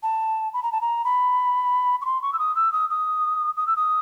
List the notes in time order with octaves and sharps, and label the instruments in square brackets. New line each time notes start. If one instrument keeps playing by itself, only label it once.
[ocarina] A5
B5
A#5
A5
A#5
B5
C#6
C6
C#6
E6
D#6
E6
D#6
D#6
D#6
E6
D#6